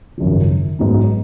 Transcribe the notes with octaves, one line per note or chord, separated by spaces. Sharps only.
G#1 F#2 C#3 F3
G#2 F#3 B3 D#4